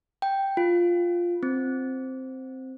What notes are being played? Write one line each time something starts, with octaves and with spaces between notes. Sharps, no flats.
G5
F4
C4